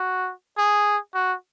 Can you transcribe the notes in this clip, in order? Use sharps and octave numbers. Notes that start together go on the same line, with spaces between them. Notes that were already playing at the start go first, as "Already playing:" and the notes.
Already playing: F#4
G#4
F#4